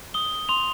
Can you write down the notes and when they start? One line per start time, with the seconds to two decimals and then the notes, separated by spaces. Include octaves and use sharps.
0.14 D#6 G7
0.49 C6 F7